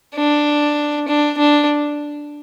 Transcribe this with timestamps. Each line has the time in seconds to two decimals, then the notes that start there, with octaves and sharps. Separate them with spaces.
0.16 D4
1.08 D4
1.38 D4